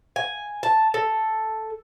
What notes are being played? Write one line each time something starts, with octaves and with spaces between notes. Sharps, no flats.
G#5
A5
A4